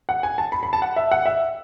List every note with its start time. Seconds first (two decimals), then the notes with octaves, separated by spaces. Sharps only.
0.09 F#5
0.23 G#5
0.38 A5
0.52 B5
0.63 B5
0.73 A5
0.82 F#5
0.96 E5
1.11 F#5
1.26 E5